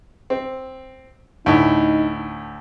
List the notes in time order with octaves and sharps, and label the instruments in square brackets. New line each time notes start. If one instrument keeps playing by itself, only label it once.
[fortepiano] C4
[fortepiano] D2 A2 [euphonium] D#4